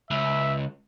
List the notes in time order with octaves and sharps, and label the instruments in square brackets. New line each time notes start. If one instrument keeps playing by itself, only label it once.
[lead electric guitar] C#2 [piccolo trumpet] E5